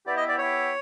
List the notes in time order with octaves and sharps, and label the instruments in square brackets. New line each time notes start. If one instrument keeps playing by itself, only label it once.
[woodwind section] B3 E4 G4 [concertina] D5
[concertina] D#5
D5
[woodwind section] B3 E4 G4 [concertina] C#5